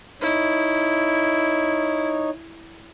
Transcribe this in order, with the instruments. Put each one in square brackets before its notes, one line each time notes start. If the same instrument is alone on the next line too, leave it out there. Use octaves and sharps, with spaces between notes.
[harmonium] D#4 C#5 [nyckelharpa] E4